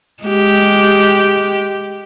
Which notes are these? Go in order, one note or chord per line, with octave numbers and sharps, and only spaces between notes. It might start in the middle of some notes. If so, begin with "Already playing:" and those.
G#3 G4